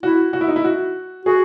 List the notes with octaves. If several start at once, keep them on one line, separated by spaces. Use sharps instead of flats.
E4 F#4
F#4
E4
D#4
E4
F#4
F#4 G#4